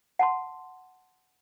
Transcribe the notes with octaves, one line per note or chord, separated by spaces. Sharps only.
F#5 A5 C6